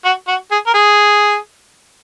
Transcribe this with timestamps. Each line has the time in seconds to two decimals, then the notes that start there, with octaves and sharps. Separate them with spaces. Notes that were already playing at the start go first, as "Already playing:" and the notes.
0.05 F#4
0.28 F#4
0.51 G#4
0.67 A#4
0.74 G#4